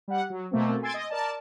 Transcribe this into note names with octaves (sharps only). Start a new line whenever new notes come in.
G3 F#5
F#3
B2 A3 A#3 C4
G#5 C6 E6 G#6 A6 D7
D#5
A#4 D5 A5